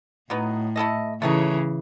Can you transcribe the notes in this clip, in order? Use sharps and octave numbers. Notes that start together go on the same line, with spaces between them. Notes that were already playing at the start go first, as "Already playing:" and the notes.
A2 F#3 B3 D#4
A3 E4 A4 D#5
C#3 E3 A3 D#4 G#4 C#5